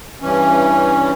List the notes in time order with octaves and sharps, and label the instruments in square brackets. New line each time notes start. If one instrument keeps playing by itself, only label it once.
[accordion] G2 E3 C#4